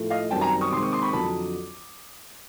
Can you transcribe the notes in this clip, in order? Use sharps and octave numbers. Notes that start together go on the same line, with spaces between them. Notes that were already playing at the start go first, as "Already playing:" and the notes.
Already playing: A2 F3 A3
D#5 F5
F#2 D#3 G3 C4 G5 A5
G#5 A#5
C#6 D#6
C3 D#3 G#3 C4 C6 D6
C#6 D#6
C6 D6
B5 C#6
F2 D3 F#3 A5 B5